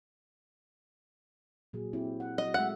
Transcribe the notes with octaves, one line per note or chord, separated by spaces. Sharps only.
A#2 F#3 G#4
C4 E4 G4
F#5
F#3 D#5
G#3 A3 E5 F#5